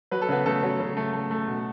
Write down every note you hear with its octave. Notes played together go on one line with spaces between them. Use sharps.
F#3 B4
A4
C#3 B3 B4
C#3 A3 A4
F#3
C#3
A3
A3
A3
B2